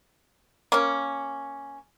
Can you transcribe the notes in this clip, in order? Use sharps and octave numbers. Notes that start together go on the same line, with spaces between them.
A#3 C#4